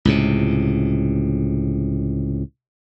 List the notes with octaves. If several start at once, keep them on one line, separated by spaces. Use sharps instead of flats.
C#2 A2 C3